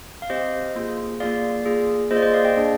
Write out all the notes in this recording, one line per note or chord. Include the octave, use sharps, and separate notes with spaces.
F5
C4 G4 C5 D#5
A#3 F4 G#4
A#3 F4 G#4 D5 F5
A#3 F4 G#4
A#3 F4 G#4 C5 D#5
D5
C5 D#5
D5 F5
D#5 G5
A#3 D4 G#4